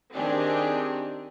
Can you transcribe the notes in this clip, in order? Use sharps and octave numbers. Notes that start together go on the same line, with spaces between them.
D#3 C4 D4 G4 G#4